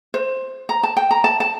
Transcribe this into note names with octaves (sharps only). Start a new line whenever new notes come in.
C5
A#5
A5
G5
A#5
A5
A5